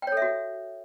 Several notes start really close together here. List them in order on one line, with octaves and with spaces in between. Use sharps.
G5 C#5 A4 E5 F#4